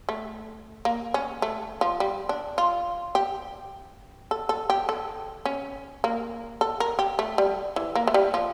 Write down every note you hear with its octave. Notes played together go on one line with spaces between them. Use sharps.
A3
A#3
C#4
A3
F3
G3
D4
F4
G4
A4
A4
G4
A4
C#4
A#3
A4
A#4
G4
A3
G3
E3
A#3
A3
G3
F3